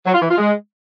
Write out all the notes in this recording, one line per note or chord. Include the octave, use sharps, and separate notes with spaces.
F#3
F4
E3
F4
G#3